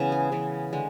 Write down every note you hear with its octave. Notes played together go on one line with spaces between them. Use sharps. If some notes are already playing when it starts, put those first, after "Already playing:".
Already playing: C#3 E3 G#3 B3
G#4
C#3 E3 B3
D3 G#3 C#4